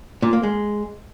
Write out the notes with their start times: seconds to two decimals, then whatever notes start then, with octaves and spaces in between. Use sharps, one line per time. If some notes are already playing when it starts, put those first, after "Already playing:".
0.22 A#2
0.33 A#3
0.43 G#3